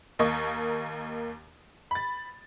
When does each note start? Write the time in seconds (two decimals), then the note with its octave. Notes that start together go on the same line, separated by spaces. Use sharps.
0.19 D#2 A#3 D#5 C#6
1.91 B5 A6